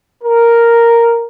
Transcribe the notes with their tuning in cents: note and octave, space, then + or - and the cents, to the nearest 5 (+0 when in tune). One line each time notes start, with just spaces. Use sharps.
A#4 +0